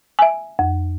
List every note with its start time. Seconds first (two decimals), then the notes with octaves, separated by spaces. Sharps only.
0.19 E5 G#5
0.59 F2